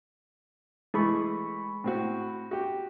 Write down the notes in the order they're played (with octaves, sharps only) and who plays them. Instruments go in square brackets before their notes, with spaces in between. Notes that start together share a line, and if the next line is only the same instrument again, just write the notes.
[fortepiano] E3 A3 G#4 [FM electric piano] G#3 B5 C#6
[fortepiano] A2 C4 F#4
F#4 G4